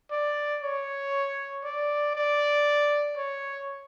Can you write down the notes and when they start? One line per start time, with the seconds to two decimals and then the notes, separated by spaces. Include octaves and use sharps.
0.11 D5
0.62 C#5
1.64 D5
2.15 D5
3.17 C#5